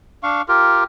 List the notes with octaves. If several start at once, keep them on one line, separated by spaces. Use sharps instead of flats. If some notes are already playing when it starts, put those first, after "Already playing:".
D4 F5 C#6
F4 G4 A#4